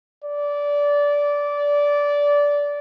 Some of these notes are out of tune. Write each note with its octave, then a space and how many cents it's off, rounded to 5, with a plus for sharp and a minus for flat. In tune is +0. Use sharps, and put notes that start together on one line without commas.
D5 -20